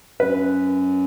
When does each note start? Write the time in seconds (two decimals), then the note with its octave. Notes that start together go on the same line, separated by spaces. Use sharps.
0.20 F#2 B4